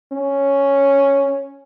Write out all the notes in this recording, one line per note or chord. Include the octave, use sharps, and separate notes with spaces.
C#4